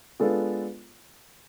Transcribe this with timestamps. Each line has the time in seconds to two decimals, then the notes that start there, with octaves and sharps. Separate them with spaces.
0.19 G#3 B3 D4 F4 A4